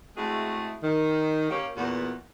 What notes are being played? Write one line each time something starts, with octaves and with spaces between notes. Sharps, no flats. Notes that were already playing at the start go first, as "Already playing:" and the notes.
G#3 A3 C4 E4 F#4 G#4
D#3
A#3 C#4 G4
E2 A#2 B3 F#4